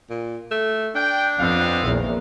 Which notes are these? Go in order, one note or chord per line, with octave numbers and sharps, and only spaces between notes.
A#2
A3
D4 G5
F2 B3 C4 F5
A#1 E2 D#3 A#3